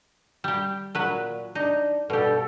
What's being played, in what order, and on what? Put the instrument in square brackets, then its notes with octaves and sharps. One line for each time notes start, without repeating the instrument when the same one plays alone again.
[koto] G3 G4
[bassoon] A#2 [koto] F#3 B4
[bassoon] D4 [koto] D#4
[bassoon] G2 [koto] B2 G4 [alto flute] A4